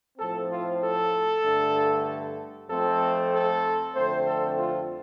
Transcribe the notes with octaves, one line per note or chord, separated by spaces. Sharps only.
A2 F3 C4 A4
F4
A4
G2 D3 A3
F2 F3 A3 C4 A4
A4
F2 D3 A3 C4 C5
A4
F4